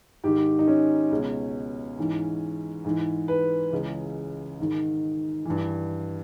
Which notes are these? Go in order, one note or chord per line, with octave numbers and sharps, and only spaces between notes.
G#2 D#3 G4
D#4
C#4
C#2 B2
G#2 E3
G#2 E3
B4
C#2 C#3 E3
G#2 D#3
G2 E3